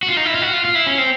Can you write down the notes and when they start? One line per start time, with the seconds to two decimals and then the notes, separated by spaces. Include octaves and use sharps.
0.03 F#4
0.09 F4
0.17 D#4
0.25 E4
0.34 F4
0.42 F#4
0.54 F4
0.65 F4
0.75 E4
0.87 C#4
0.98 C4